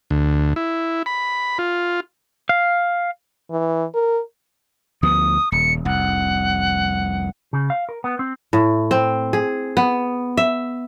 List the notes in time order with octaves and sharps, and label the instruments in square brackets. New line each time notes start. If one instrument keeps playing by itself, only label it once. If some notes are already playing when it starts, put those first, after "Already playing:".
[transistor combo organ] D2
E4
B5
F4
[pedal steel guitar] F5
[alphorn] E3
A#4
[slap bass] D2 F3 B3 [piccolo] D#6
[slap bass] D#1 [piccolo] C#7
[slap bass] F1 C2 [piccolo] F#5
[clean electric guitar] C#3
F5
A#4
B3
C4
[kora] A2
C4
G#4
B3
E5